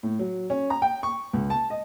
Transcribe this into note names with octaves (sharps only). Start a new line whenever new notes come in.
A2
F#3
C#4
A#5
G5
C#6
C#2
A5
D#5